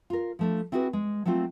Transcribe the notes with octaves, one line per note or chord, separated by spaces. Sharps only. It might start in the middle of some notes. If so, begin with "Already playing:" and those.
F4 A#4
F3 A3 D4
C4 E4 F#4 G#4 B4
G#3
F#3 A3 A#3 C4 F4